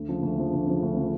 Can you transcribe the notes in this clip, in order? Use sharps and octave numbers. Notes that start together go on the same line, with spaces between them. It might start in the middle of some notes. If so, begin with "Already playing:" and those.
Already playing: D2
C#3 F3
D2
C#3 F3
D2
C#3 F3
D2
C#3 F3